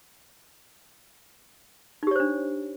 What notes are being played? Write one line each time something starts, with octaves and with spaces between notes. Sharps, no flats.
D4 D#4 G4 C5 C#5